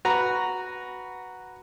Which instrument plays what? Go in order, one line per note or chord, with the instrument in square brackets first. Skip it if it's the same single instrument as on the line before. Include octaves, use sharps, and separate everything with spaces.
[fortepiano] F#4 B4 A#5